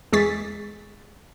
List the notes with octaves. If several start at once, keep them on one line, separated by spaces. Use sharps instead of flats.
E2 G#3 G#4 C#6 A6 B6